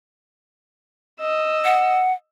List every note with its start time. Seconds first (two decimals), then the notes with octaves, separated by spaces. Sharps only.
1.20 D#5 E6
1.65 F#5